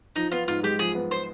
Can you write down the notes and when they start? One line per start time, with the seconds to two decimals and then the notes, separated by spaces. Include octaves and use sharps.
0.16 F3 D#4
0.32 B3 F4
0.48 G#2 F4
0.63 G#3 G4
0.79 F3 G#4
0.95 B3
1.11 C5